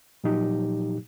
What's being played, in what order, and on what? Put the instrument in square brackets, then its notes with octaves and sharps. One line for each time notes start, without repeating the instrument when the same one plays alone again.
[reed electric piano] A#2 F3 F#3 D#4 G4